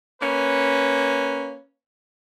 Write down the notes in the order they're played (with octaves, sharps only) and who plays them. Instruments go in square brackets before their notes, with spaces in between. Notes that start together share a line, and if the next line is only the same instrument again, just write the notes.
[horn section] A#3 C#4 B4